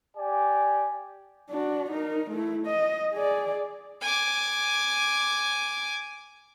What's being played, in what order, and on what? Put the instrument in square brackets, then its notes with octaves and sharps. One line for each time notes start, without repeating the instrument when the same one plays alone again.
[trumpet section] G4 D5 G#5
[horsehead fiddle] D4 F#4
D#4 A#4
A3 E4
D#5
G#4 D5
[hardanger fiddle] G#5 D6